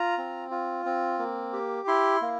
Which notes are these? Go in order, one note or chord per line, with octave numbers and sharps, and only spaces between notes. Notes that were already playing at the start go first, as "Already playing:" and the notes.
Already playing: F4 A#5
C4
F4
C4
A#3
G4
E4 C6
A#3